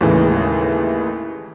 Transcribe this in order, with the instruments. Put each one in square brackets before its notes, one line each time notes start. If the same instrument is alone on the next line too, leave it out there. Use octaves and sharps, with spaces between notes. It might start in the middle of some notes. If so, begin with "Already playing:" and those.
[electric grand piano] D#2 A2 C#3 E3 G#3